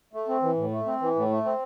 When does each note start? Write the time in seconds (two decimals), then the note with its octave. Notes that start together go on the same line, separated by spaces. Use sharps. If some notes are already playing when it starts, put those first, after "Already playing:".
0.13 A3
0.28 C4
0.42 E3
0.57 A2
0.71 A3
0.86 C4
1.01 E3
1.16 A2
1.30 A3
1.45 C4